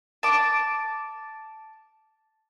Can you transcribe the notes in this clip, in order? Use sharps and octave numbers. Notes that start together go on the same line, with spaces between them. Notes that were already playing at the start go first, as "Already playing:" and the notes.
A5 D6